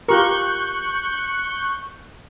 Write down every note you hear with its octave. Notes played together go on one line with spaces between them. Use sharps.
F4 G4 A#4 C#6 F#6 G6